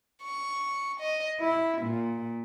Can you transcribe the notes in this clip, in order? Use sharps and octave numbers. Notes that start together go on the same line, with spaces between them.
C#6
D#5
E4
A#2